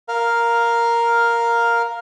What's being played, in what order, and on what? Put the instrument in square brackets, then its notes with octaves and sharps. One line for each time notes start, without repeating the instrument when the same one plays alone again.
[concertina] A#4 F5